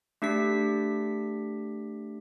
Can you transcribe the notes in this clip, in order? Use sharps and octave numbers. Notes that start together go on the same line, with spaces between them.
A3 D4 G4 B6